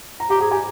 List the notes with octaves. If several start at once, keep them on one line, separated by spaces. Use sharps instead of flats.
A#5
G4 A#5
G#4 A#5
G4 G#5